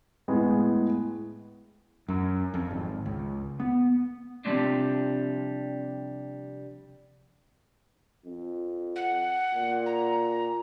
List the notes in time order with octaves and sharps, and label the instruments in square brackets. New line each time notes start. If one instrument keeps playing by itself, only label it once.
[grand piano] A2 G#3 B3
[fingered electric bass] F#2
F2
G#1
C#2
B3
[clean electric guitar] C3 F3 G3 G#3 C4 D4
[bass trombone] F2
[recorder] F#5
[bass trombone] A#2
[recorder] A#5